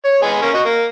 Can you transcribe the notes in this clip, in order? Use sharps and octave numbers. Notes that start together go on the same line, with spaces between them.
C#5
G#3 B3 G#5
A#3 C#4
F#4 D#5
A#3